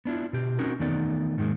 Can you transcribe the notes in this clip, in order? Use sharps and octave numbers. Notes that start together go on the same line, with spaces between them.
B3 D4 E4 F4
B2 G4
C4 C#4 D#4 F#4 A#4
E2 D#3 A3 B3 D#4 D5
G#2 D#3 F#3 G#3 A#3